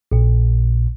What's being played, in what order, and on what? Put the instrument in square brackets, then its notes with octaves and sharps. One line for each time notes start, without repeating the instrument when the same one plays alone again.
[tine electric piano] A#1 A#2